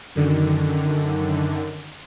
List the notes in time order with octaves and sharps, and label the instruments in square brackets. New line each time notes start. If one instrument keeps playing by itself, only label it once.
[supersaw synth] F#2 D3 D#3